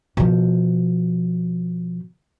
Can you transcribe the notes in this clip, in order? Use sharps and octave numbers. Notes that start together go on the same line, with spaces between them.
B2 F3